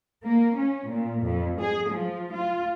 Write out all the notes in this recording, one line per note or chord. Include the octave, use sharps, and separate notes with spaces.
A#3
C#4
A#2
F2
G#4
F3
F4